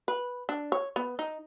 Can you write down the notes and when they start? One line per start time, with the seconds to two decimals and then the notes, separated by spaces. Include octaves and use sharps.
0.08 B4
0.49 D4
0.72 C#5
0.96 B3
1.19 D#4